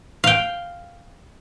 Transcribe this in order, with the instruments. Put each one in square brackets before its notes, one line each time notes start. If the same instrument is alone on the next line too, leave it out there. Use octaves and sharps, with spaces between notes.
[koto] F5 G5